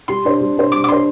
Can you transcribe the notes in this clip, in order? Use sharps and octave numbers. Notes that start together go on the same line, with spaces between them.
G3 C6
D4 C5
G3
D4 C5
G3 D6
D6
D4 C5 C6